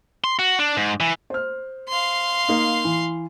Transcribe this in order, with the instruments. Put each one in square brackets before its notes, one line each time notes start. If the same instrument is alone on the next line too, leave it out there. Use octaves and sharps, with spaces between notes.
[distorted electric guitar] C6
F#4
D4
G#2
E3
[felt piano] C5 F6
[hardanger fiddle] F5 C6
[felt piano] A#3 D#4
E3